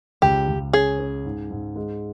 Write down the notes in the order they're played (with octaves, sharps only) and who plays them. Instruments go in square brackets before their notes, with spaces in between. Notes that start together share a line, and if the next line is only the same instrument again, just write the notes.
[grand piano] C#2 [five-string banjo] G4
[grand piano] C#2
[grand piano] C#4 [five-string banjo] G#4
[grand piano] C#4
G#2
G#2
G#3